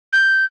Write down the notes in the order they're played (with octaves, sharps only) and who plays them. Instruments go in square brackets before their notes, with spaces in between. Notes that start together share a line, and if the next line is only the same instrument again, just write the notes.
[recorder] G6